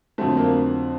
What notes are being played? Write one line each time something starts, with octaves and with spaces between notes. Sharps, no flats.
F2 D3 F#3 A3 C4
A#3